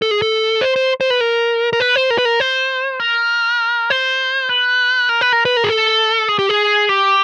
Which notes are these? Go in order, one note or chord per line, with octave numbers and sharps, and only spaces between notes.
A4
G#4
A4
C5
C5
C5
B4
A#4
A#4
B4
C5
A#4
B4
A#4
C5
A#4
C5
B4
A#4
B4
A#4
B4
A#4
G#4
A4
G#4
G4
G#4
G4